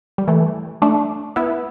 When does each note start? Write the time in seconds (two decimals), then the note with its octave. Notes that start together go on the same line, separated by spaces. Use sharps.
0.18 G3
0.28 E3 A3
0.82 A3 D4
1.36 B3 E4